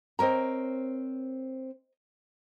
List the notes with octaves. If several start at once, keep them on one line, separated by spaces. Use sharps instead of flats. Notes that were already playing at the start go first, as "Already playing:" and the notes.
C4 A#4 C5 C#5 D#5 A#5